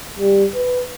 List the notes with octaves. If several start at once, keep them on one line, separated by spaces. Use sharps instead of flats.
G3
B4